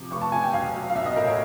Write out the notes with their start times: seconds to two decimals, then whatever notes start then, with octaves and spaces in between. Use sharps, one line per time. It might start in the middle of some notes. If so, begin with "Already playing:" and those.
Already playing: C3 F3 D6
0.11 F1 C#6
0.22 A5
0.32 E2 G#5
0.44 G5
0.53 B1 F5
0.75 F#3
0.90 F5
0.95 B1 E5
1.06 D#5
1.16 A2 A#4
1.27 C#5